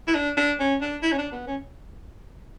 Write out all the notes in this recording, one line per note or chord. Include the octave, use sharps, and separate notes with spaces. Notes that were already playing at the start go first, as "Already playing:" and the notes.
E4
D4
D4
C#4
D4
E4
C#4
D4
B3
C#4